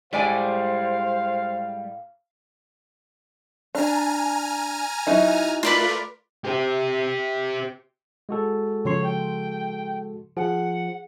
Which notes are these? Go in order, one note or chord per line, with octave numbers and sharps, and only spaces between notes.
A2 G3 G#3 C5 D5 F5 G#5
D4 G#5 A#5 F6
F#3 D#4 E4
A3 F4 A#4 B4 D5 C6
G4 C5
G#3 F#4 A4
C#3 F3 C#5 C6
G5
F3 G#4 F#5